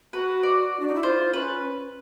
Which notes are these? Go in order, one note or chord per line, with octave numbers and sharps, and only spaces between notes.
F#4 B4
D5
D4
D#4
E4
F4 C5
C#4 B4